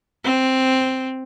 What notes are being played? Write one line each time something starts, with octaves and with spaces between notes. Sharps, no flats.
C4